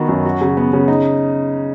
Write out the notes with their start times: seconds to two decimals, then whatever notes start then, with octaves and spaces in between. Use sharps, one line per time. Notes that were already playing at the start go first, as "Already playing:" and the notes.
Already playing: D#3 B3 F#4
0.09 F#2
0.25 F#4
0.41 C#3
0.57 B3
0.73 C#3
0.88 D#4